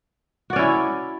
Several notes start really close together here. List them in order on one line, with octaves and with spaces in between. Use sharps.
F#4 D5 C#4 E4